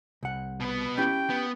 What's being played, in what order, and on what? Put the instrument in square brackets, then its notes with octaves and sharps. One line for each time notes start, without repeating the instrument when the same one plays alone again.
[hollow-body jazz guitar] C2 F#5
[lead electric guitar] B2 B3
[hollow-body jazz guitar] C#4 E4 G4 [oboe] G5
[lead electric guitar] B3